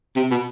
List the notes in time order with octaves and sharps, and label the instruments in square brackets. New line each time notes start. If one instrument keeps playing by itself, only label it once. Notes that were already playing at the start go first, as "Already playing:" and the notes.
[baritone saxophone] C3
B2